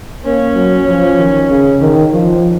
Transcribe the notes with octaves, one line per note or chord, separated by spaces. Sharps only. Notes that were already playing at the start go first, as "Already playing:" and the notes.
A#3 C#4
F#3
F3
D#3
C#3
D#3
F3